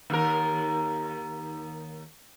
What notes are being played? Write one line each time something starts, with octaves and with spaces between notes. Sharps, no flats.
D#2 A#4